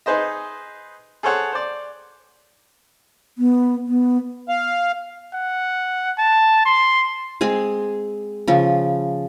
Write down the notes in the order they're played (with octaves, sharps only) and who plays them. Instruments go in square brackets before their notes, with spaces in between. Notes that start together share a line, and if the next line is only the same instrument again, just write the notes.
[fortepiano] D#4 G#4 B4 C5 D#5
G#4 A4 C5 C#5 F#5
C5 D5
[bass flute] B3
B3
[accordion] F5
[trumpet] F#5
A5
C6
[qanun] G#3 C4 G#4
C#3 F3